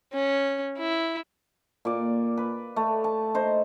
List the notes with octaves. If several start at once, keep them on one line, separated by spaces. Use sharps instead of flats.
C#4
E4
A#2 D5
B4
A3
A5
D#4 C5